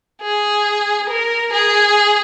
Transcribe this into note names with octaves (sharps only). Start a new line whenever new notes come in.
G#4
A#4
G#4